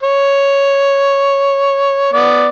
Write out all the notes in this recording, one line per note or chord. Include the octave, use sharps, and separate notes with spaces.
C#5
B3 D5